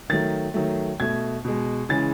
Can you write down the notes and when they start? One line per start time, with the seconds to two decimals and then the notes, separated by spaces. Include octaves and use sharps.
0.10 D#3 F#3 A3 A6
0.54 D#3 F#3 A3
1.00 B2 A3 G#6
1.45 B2 G#3
1.89 C#3 E3 G#3 A6